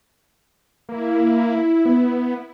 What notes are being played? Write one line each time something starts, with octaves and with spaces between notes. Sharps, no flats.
A#3 E4
B3